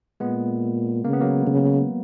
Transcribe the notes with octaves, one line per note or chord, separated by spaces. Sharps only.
A#2 G#3 B3
C#3 A#3
B3
F#3 A#3
C#3